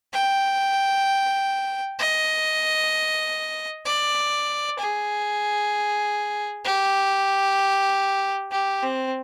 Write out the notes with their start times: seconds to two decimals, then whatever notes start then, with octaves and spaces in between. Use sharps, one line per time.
0.13 G5
1.99 D#5
3.86 D5
4.79 G#4
6.65 G4
8.51 G4
8.82 C4